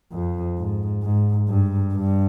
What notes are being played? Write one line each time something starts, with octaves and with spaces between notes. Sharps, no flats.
F2
G#2
G#2
G2
G2